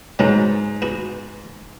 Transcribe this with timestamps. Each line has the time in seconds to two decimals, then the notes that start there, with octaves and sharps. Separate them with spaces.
0.19 G#2 F#3 B3 C#4
0.82 B3 F#4